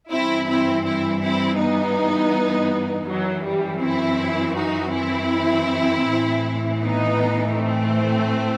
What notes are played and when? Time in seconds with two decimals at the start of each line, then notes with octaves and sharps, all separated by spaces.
0.10 G2 E3 C4 E4
0.48 C4 E4
0.85 C4 E4
1.22 C4 E4
1.59 B3 D#4
3.08 F#2 E3 F#3
3.46 G3
3.83 C4 E4
4.57 D#4 F#4
4.94 C4 E4
6.05 A2 E3
6.80 B3 D#4
7.54 A3 C4